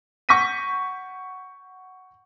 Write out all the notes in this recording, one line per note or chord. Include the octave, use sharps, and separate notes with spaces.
F#5 C#6 G6 A#6 B6 D#7